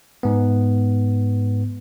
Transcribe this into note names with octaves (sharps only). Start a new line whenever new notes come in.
G#2 B3